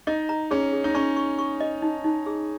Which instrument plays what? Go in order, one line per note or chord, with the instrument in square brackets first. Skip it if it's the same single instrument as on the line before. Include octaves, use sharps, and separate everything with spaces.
[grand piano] D#4 [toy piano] D#5
[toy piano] A#5
[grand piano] C#4 [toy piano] G#4
[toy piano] G#4
[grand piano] D#4
[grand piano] C#4 [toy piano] C#6
[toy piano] C#6
C#6
D#5
D#4
D#4
G#4